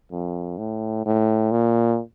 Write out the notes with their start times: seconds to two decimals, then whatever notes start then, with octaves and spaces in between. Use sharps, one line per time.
0.12 F2
0.58 A2
1.06 A2
1.51 A#2